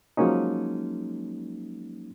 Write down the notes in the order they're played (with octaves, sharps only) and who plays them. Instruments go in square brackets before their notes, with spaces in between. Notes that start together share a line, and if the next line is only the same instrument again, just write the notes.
[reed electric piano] F3 F#3 G#3 A#3 C#4 D#4